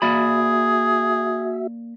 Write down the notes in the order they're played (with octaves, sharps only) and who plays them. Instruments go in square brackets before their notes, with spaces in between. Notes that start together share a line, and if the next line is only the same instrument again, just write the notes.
[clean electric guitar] A#3 D5 B5 [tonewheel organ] F#4 E5 [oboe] G#4